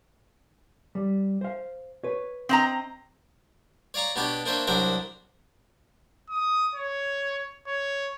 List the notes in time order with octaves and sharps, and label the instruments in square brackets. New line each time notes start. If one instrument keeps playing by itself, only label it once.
[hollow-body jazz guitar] G3
C5 F5
B4 C#5
[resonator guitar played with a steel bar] C4 D#5 A#5
[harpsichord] C#5 D5 F5 A#5 C#6
B2 B3 D4 G4 C#5 D6
A#3 D4 C5 C#5 E5
C2 F#3 D4 A#4 C5 E5
[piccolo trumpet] D#6
C#5
C#5